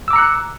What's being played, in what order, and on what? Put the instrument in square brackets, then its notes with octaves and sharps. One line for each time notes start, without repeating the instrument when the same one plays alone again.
[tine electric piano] E6
D6
A#5
C#7
F#6